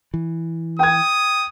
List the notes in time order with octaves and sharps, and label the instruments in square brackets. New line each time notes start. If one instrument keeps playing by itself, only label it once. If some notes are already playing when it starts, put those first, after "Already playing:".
[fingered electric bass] E3
[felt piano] G5 G#6 [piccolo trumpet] D#6